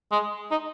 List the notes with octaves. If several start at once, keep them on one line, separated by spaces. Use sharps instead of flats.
G#3
D#4